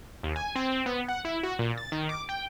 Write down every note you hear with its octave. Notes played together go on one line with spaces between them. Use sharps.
D#2
G#5
C4
B3
F#5
E4
F#4
A#2
A6
D#3
D6
G5